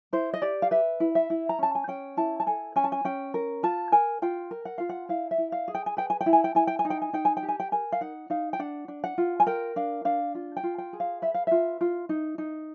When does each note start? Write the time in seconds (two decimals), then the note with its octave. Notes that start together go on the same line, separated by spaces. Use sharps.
0.13 E4 C5
0.34 D#5
0.42 G4 D5
0.62 F5
0.71 B4 E5
1.00 E4
1.15 E5
1.30 E4
1.49 A#5
1.59 C#4 A5
1.75 G#5
1.88 C#4 G5
2.17 E4 A5
2.40 A5
2.47 A4 G#5
2.76 C#4 G#5
2.84 A5
2.92 G#5
3.05 C#4 G5
3.34 A#4
3.63 F4 A5
3.92 A#4 G#5
4.22 F4 G5
4.51 A#4
4.65 F#5
4.78 F4 F5
4.89 F#5
5.09 E4 F5
5.31 E5
5.38 E4
5.52 F5
5.68 G#4
5.75 G5
5.86 G#5
5.97 B4 G5
6.10 G#5
6.21 G5
6.26 E4
6.33 G#5
6.44 G5
6.55 E4 G#5
6.67 G5
6.79 G#5
6.85 D#4
6.90 G5
7.02 G#5
7.13 D#4 G5
7.25 G#5
7.37 G5
7.43 G4
7.48 G#5
7.60 G5
7.72 A#4 G#5
7.92 F5
8.01 D#4 F#5
8.30 D#4 F5
8.53 G5
8.59 D4 F#5
8.88 D4
9.04 F#5
9.18 F4
9.40 G#5
9.46 A#4 G5
9.76 D4 F5
10.05 D4 F5
10.35 F4
10.57 G5
10.63 F4
10.78 G5
10.93 G#4
11.00 F5
11.22 B4 E5
11.34 F5
11.47 F4 E5
11.81 F4
12.09 D#4
12.38 D#4